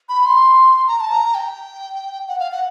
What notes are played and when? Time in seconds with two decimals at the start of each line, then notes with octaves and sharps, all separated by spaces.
0.09 B5
0.26 C6
0.87 A#5
1.00 A5
1.12 A#5
1.35 G5
2.28 F#5
2.39 F5
2.52 F#5